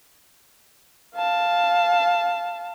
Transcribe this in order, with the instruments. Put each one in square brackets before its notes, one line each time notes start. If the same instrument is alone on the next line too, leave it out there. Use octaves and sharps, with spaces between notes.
[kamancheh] F5 A5